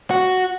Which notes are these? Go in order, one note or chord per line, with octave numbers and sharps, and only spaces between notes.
F#4